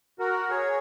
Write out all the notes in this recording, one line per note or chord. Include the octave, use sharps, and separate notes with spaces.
F#4 A#4
G#4 C#5